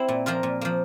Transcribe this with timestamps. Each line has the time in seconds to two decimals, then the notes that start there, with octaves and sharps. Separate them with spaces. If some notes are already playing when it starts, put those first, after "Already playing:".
Already playing: C4 E4
0.08 A#2
0.26 F3 A#3 F4 A#4
0.43 A#2
0.61 F3 A#3